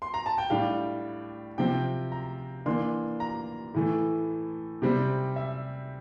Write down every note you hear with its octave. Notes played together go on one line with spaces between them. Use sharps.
C6
A#5
A5
G5
A2 G3 D4 F5
C3 F3 C4 G5
A#5
E3 A#3 D4 C6
A#5
A2 E3 A3
C3 G3 C4
E5